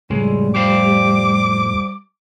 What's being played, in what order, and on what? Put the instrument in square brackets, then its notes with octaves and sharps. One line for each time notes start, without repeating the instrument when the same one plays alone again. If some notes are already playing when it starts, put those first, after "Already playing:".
[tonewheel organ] F2 A2 [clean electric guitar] C#3 G#3 [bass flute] G3
[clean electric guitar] G4 C5 F5 [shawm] D6